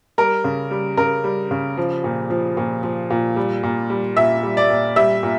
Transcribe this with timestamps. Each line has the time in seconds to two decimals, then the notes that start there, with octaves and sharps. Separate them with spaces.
0.18 G3 A#4
0.44 C#3
0.71 G3
0.97 C#3 A#4
1.24 G3
1.51 C#3
1.77 F3
2.04 A#2
2.30 F3
2.57 A#2
2.83 F3
3.10 A#2
3.36 G3
3.63 A#2
3.90 G3
4.17 A#2 E5
4.43 G3
4.57 D5
4.70 A#2
4.96 G3 E5
5.23 A#2